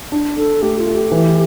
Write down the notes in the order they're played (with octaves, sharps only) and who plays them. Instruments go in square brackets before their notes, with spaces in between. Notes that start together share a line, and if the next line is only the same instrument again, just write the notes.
[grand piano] D4
[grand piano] D4 [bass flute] A4
[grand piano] A3 [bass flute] G4
[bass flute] F4
[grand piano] A3
[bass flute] G4
[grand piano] E3